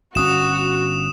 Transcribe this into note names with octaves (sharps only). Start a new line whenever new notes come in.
G1 C#4 F#4 D#6 E7